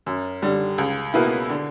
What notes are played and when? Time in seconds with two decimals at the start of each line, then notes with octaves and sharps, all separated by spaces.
0.06 F#2
0.42 D3 G3
0.78 C#2
1.14 B2 A#3 E4 B4
1.49 D3